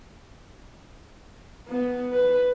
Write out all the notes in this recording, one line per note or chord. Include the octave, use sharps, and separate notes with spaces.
B3
B4